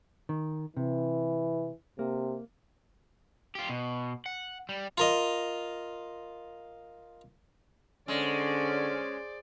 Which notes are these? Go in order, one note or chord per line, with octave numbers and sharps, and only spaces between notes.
D#3
C3 E3
C3 A#3
F4 G4
B2
F#5
G3
F4 A#4 D#5
D3 G#3 C#4 C5 D5